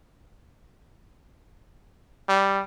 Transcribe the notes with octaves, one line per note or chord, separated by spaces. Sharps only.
G3